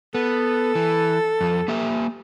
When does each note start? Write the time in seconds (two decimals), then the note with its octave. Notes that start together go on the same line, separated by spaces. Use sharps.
0.14 B3 A4
0.75 E3
1.41 F2 F3
1.68 A#3 G4 E5